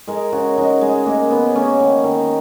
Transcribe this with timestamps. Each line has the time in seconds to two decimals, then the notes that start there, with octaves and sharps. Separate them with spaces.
0.08 G#3 A#4
0.32 C#3 F#4
0.58 G#3 D#4
0.81 G#3
1.06 G#3 A#3
1.30 C#3 B3
1.55 A#3 C#4
1.80 D#3
2.04 D#3